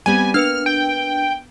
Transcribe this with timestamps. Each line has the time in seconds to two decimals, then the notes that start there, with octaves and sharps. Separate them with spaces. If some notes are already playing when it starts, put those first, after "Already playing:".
0.06 G3 B3 C4 G#5
0.34 A#3 D4 B4 F6 C#7
0.66 G5